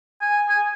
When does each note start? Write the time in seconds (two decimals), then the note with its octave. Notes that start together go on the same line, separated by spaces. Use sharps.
0.21 G#5
0.49 G#5